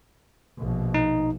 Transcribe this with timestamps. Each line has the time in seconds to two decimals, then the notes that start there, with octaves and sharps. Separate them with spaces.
0.58 A#1 B2
0.94 D#4